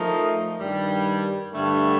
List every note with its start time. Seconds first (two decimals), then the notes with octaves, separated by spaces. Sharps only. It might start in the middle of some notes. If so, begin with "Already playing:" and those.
Already playing: F3 A3 D#4 A#4
0.59 G2 D#3 G3
1.52 G2 D3 A3